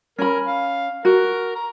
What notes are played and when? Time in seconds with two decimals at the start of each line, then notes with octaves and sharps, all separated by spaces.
0.18 C#4 A#4 B5
0.46 F5
1.05 F#4 A#4
1.55 A#5